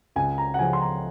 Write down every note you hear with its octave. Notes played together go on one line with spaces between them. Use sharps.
C#2 G#5
A#5
F#5
C#3 F3 G#5
C6
A#5